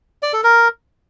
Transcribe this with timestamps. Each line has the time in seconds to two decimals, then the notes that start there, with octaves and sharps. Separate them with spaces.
0.23 D5
0.33 A4
0.44 A#4